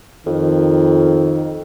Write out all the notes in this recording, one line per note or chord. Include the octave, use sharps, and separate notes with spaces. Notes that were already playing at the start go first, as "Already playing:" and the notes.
F2 D#3